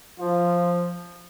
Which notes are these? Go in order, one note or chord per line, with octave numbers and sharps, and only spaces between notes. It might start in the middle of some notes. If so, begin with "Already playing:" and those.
F3 F4